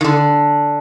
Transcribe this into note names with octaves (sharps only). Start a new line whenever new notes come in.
D#3
D3